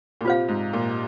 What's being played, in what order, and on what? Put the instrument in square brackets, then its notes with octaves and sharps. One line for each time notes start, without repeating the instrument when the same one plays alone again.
[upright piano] A#2
[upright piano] C3 [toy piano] F4 C5 F5
[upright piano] G#2
A#2